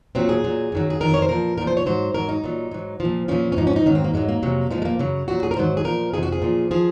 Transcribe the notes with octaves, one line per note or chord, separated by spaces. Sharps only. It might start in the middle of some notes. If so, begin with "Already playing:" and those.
A#2 F#3 C4
G#4
A#2 F#3
F#2 D#3 F#3
G#4
F2 D#3 F#3 A#4
C#5
C5
A#2 F3 A#4
A#2 F3 A#4
C5
C#5
G#2 F#3 C5
G#2 F#3 A#4
D#4
A#2 F#3
G#2 F#3
F3
A#2
A#2 F3 C#4
C#4
G#2 F3 D#4
C#4
D#4
G#2 D#3 F#3 C#4
C4
A#3
G#2 F#3 G#3
A#3
F2 C3 F#3
A#2 F3 G#3
G#3
A#3
F#2 C#3 F#3
A#2 F#3 F#4
G#4
A#4
G#2 D#3 F#3 C5
G#4
A#2 F3 A#4
F2 C3 F3 G#4
F#4
G#4
A#2 F3
F3 G#4